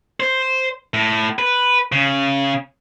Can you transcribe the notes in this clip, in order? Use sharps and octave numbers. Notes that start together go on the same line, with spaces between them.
C5
A2
B4
C#3